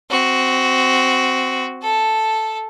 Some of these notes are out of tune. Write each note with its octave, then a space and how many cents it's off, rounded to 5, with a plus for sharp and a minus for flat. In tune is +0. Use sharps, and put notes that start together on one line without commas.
C4 -10 F#4 +5
A4 +0 A5 +0